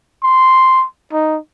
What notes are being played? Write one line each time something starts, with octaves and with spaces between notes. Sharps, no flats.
C6
D#4